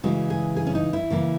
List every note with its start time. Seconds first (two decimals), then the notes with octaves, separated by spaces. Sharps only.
0.04 C#3 E3 G#3 F#4
0.30 G#4
0.57 G#4
0.66 C#4
0.75 D#4
0.93 E4
1.10 C#3 E3 A#3